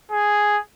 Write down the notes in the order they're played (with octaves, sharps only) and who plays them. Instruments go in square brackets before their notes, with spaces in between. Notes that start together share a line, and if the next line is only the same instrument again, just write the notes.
[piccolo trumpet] G#4